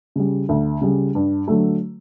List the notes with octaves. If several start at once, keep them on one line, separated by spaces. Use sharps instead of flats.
C#3 G3
D2
C#3 G3
G2
D3 F#3 A3